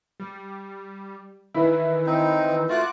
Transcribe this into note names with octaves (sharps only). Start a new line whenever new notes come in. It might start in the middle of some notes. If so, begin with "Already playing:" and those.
G3
D#3 E3 E4 B4
C4 D#4
A3 F4 F#4 D6 F#6